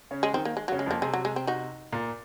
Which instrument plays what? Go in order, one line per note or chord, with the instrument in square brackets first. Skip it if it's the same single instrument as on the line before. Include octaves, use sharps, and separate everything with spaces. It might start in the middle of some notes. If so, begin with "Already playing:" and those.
[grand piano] C#3 C#4
[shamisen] G#3
[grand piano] D#3 D#4 [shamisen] C4
[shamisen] A#3
G#3
F#3
[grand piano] C#3 C#4
[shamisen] G#3
[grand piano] F2 F3 [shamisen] A#3
[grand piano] C3 [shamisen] G#3
[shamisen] F#3
G#3
C4
D#4 F#4
[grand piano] A#2